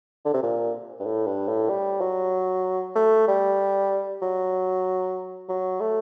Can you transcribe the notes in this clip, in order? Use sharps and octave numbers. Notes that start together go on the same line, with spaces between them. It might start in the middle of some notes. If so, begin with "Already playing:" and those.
D3
C3
A#2
G2
A2
G2
A2
G3
F#3
A3
G3
F#3
F#3
A3